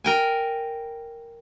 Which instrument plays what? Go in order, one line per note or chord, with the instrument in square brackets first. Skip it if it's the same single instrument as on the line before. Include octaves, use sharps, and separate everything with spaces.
[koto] A#4 G5 G#5